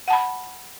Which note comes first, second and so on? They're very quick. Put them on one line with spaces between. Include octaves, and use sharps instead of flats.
F#5 A5 B5